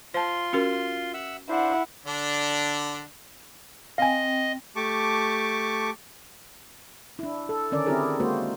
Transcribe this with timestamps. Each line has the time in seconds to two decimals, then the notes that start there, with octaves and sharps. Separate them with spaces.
0.14 F4 C5 A5 C6
0.53 C#4 F#4 A#4
1.14 E5 F#5 E6
1.49 D4 E4 C5 F#5
2.06 D3 D4
3.98 C4 D#5 F5 G5 G#5
4.76 A3 G4 A5 C#6 D6
7.19 D4 E4
7.49 A4
7.71 D3 D#3 C#4 A#4 D5
7.86 C4 D4 E4 G4 G#4 A#4
8.20 G#3 A#3 F#4 C5